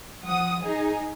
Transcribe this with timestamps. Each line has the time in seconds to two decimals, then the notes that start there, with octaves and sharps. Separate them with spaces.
0.25 F3 F#5 D#6
0.62 D#4 G#4